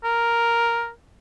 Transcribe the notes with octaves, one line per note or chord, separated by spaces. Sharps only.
A#4